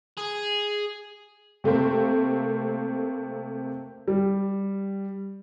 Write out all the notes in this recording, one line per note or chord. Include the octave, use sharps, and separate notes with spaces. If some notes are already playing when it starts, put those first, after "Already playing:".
G#4
C3 A3 A#3 C4
G3